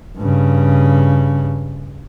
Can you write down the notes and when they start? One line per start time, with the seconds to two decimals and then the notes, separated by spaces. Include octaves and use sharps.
0.17 G2 C#3